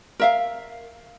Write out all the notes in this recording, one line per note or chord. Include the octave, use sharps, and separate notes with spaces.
A#4 E5 F5